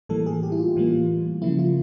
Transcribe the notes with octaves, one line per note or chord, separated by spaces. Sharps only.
A2 E3 G3 A#3 A4
G#4
G4
E4
F4
A2 E3 G3 A#3
C#3 F3 A#3 E4
F4